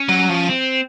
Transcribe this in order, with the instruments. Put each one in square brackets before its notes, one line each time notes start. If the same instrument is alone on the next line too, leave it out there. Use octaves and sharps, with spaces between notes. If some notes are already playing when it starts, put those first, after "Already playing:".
Already playing: [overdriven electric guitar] C#4
[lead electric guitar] F#3
F3
[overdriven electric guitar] C4